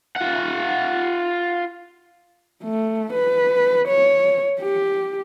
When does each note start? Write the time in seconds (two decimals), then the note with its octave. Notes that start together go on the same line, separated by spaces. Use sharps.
0.16 F4 F#5
2.64 A3
3.13 B4
3.88 C#5
4.61 G4